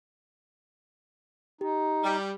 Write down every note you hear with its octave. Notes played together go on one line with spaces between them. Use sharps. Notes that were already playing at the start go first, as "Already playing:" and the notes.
D#4 G4
G3